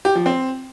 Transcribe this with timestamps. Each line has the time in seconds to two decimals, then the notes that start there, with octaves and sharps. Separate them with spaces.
0.05 G4
0.15 F3
0.26 C4